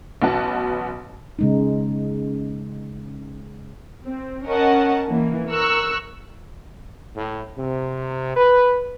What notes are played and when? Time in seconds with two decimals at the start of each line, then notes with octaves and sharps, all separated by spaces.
0.22 A1 B2 F#3 B3 F#4 A5
1.39 C#3 G#3 D#4
4.03 C4
4.48 C#4 A#4 D#5 F#5 A5
5.08 E3 A#3
5.50 A#4 C#6 E6 F#6
7.15 A2
7.56 C3
8.36 B4